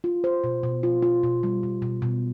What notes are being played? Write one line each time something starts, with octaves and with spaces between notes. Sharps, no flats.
F4
C5
B2
B2
F4
F4
B2
G3
B2
B2
B2